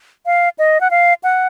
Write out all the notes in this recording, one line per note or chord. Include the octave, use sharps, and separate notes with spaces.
F5
D#5
F#5
F5
F#5